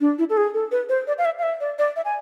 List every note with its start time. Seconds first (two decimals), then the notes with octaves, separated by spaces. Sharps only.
0.01 D4
0.18 E4
0.30 A4
0.37 G#4
0.54 A4
0.72 B4
0.89 C5
1.07 D5
1.18 F5
1.25 E5
1.38 F5
1.43 E5
1.60 D5
1.79 D5
1.96 E5
2.05 G#5